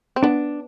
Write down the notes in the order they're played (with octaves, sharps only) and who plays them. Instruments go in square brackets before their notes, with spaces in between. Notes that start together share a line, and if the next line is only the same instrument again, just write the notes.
[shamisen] C4
[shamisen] B3 [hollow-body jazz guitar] D4